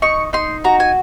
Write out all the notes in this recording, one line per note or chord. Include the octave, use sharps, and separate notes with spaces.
D#4 C#6
D#4 C6
F#4 A#5
G#5